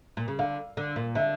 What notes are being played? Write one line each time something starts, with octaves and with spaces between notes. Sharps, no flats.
A#2
C#3
D3 F5
D3
A#2
D3 E5